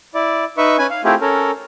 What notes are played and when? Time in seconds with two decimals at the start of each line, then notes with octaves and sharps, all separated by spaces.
0.15 E4 D5
0.57 D#4 B4 E5 C#6
0.78 C#4 B4 G#5
0.90 F5
1.04 A3 C4 E4 F4 G4 G#4
1.21 C#4 A4 A#4